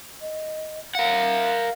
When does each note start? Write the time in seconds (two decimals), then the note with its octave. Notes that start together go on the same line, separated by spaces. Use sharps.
0.21 D#5
0.95 A#4 F5 F#5